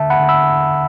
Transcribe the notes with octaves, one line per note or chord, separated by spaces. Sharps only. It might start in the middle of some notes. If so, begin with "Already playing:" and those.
Already playing: D3 E5 A5
F#5 B5
D3
B5 E6